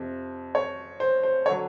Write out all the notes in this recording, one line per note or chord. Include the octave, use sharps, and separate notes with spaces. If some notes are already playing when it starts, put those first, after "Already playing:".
Already playing: F2 C3 F3
C#5
C5
C5
C#5
D3 F#3